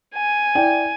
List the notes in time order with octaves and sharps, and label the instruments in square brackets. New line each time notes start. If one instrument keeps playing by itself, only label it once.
[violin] G#5
[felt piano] E4 D5 G5